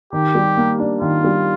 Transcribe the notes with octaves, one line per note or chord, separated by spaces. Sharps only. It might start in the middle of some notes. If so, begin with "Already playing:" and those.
D#3 G4
G3
A#3
D4
D#3 F4
G3